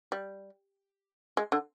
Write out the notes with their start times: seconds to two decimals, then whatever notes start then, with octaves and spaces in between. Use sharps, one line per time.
0.12 G3
1.37 G#3
1.52 D3